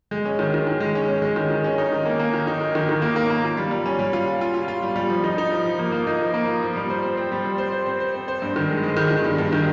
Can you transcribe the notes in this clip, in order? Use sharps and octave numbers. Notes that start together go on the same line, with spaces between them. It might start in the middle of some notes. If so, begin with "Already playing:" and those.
G#3
C#4
D#3
D#3
D#3
G#3
C#4
C#4
G#3
D#3
D#3
C#4
D#4
D#3
A#3
A#3
D#3
D#4
D#3
D#3
D#3
A#3
A#3
A#3
F4
G3
G3
C#4
G3
F4
F4
F4
F4
F4
G3
G3
F3
D#4
D#4
F3
F3
A#3
A#3
D#4
F3
A#3
F3
F3
G3
C5
C4
C4
G3
C4
C5
C5
C4
C5
C4
C5
G2
D#3
G#3
G#3
D#3
D#3
G2
G2
D#3